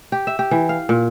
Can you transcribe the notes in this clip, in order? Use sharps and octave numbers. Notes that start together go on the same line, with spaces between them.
G4
E5
G4
E3
F5
A#2